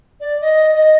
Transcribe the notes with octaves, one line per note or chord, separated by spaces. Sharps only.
D5
D#5
D#5